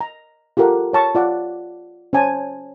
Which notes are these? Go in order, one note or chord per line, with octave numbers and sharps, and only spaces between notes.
A#5
F4 G4 A4 A#4 F#5
C#5 A5 C#6
F4 D5 F#5
C#4 C5 G#5 A5